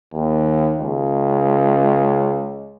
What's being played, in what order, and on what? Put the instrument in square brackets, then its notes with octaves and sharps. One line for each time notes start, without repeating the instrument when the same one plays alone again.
[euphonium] D#2
C#2